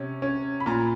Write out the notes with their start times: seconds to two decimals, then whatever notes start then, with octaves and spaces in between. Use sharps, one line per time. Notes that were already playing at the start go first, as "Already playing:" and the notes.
Already playing: C3 C#4
0.22 C#4
0.60 B5
0.66 A#2 A#5